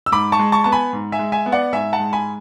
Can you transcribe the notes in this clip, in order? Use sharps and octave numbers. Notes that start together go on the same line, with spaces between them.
E6
G#2 B5 D6
A5 C#6
G#3
A5 C#6
B3 A5
G#5 B5
G#2
E5 G#5
G#3
E5 G#5
B3
D5 F#5
G#2 E5 G#5
F#5 A5
G#3
G#5 B5